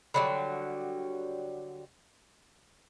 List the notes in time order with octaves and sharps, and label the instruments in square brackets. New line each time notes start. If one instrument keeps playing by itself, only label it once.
[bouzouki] D3 F#3 G3 [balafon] B5